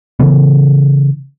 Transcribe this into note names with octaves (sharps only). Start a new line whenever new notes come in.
C#3 E3 B3